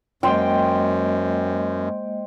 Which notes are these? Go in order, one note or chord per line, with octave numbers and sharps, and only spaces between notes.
F#2 G#3 A#3 C5 D#5 G5